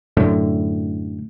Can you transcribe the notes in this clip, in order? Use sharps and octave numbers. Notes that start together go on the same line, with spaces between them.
F#2 A2 D3